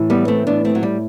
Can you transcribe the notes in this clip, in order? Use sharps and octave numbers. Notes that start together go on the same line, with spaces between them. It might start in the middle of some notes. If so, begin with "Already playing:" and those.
Already playing: A2 E3
G3 B3
A3 C4
B3 D4
A3 C4
F#3
G3